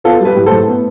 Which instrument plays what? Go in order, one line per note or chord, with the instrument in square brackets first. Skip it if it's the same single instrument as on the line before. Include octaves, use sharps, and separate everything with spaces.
[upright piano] B3 F4 A4
G3
G4 B4
A2
A4 C5
A2
B3